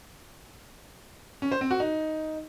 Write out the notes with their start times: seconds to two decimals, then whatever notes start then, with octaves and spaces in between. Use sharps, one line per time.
1.42 C#4
1.52 C5
1.61 C4
1.71 F#4
1.80 D#4